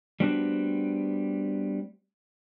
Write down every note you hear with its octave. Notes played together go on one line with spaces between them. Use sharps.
G3 A3 B3 C4 D4 F#4